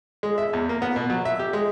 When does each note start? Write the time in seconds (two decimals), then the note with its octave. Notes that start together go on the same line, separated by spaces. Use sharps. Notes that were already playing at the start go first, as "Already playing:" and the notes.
0.23 G#3
0.38 E5
0.53 E2
0.69 A#3
0.82 B3
0.96 B2
1.10 F#3
1.25 E5
1.39 G4
1.53 G#3